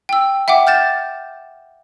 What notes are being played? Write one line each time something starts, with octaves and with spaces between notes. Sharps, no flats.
G5 E6
E5 F#5 G5 D6
F6 G6 A6 E7